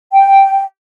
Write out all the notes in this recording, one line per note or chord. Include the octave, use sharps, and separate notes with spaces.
G5